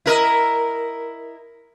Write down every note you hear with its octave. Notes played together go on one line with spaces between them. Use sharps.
E4 A#4 D#5